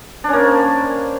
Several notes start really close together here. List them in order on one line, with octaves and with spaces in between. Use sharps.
D4 C#4 A#3 C5